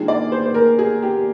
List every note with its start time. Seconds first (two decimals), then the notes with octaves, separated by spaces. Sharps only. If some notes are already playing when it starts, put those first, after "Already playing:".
Already playing: D#2 D#3 G#3 D4 F4 G#4
0.08 D5
0.32 C5
0.46 C5
0.54 A#4
0.79 G#4
1.03 G4